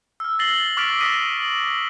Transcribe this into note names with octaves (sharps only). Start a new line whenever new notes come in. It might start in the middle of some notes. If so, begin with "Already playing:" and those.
E6 F6
E6 A6 A#6 C7 F#7 G7
C#6 D6 F6 A6 B6 D7
D#6 A#6 B6 D#7
F#7